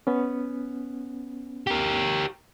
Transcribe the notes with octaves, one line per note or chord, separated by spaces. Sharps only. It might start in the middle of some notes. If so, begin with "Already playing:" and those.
B3 C#4
G4 A#4